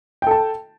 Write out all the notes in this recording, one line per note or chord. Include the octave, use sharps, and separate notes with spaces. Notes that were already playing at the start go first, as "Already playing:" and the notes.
A4 G5 A5